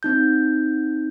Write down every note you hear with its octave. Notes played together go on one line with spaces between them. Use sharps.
C4 D#4 G6